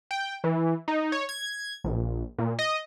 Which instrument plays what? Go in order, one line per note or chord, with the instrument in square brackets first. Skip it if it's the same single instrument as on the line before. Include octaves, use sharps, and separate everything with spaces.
[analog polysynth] G5
E3
D#4
C#5
G#6
A#1
A#2
D#5